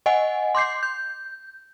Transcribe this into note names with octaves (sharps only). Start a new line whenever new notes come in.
D#5 F#5 G#5
C6 D6 G6 C7
G6